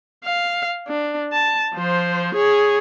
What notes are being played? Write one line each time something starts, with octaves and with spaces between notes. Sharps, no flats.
F5
D4
A5
F3 C5
G#4 C#5